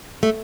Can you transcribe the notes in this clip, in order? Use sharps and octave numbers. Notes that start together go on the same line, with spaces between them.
A3